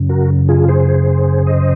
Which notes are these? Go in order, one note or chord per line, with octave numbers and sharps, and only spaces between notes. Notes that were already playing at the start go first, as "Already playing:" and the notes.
Already playing: F#2 C#3
F#4 A#4
F4 G#4
G#4 C5
C5 D#5